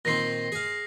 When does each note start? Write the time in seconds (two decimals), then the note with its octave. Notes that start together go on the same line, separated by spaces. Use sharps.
0.05 A#2 D#3 C4 A#6 C7
0.52 G#4 F5